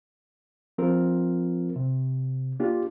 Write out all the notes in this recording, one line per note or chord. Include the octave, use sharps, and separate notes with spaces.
F3 C4 F4 A#4
C3
A#3 D4 F4 G4